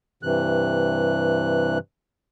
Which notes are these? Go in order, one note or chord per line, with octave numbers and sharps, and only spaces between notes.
G2 C3 E3 F#6